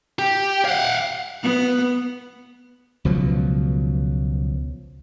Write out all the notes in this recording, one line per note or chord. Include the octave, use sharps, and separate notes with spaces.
G4
F5 F#5
B3
C#2 B2 F3 F#3